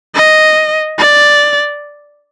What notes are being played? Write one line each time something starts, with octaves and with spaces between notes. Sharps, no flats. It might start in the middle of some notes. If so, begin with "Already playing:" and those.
D#5
D5